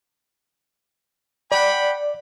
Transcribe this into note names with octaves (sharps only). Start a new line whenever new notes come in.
D5 F#5 G5 B5